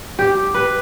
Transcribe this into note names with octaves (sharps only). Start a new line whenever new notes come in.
G4
B4